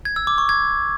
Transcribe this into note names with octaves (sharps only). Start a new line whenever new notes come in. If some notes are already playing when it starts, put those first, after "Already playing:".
G#6
E6
D6
C#6
G#6